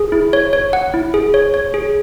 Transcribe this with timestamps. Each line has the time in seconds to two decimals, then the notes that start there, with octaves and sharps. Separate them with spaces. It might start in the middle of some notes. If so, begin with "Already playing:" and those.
Already playing: G#4
0.12 E4
0.33 C#5
0.53 C#5
0.73 F#5
0.94 E4
1.14 G#4
1.34 C#5
1.54 C#5
1.74 G#4